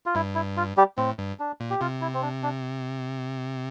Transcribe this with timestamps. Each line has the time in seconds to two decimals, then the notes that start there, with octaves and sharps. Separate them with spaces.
0.06 F4
0.15 G2 E4
0.35 E4
0.57 F4
0.77 G3 G4
0.98 A2 C4
1.18 G2
1.39 D4
1.60 A#2
1.70 G4
1.81 C3 F4
2.01 E4
2.14 C4
2.22 D4
2.43 D4